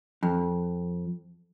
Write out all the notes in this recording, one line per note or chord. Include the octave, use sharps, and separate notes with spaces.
F2